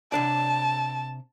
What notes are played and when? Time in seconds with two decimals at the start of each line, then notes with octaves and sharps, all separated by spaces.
0.12 C3 D4 D5 A5